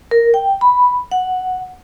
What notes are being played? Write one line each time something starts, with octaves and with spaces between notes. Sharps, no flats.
A#4
G5
B5
F#5